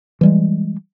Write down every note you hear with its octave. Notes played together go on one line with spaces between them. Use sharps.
E3 G3 G#3